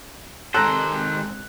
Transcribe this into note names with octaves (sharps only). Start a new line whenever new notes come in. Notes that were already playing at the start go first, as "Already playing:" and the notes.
C3 D#3 G#3 C4 A4 C5 A#5 F#6